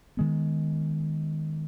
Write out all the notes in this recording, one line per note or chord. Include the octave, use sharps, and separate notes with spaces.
D#3 G#3 B3